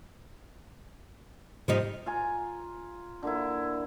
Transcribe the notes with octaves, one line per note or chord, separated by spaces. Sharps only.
G#2 F3 G3 D#4
F4 G#5 A#5
D3 A#3 E4